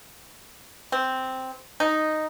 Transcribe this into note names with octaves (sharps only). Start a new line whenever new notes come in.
C4
D#4